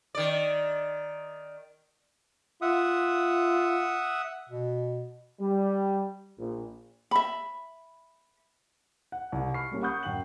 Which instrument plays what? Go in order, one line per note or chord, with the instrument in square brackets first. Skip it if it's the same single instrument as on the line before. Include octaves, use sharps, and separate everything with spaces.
[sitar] D#3 D5
[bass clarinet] F4 [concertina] E5 F#5 D#6
[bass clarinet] B2
[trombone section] G3
A#1
[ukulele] E5 B5
[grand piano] F#5
C2
B5 C#6 F6 C7
G3 G#3 A#3 C#4 G4
F#5 B5 C#6 D#6 F#6 G6
D1 F#2 F#5 G5 F#7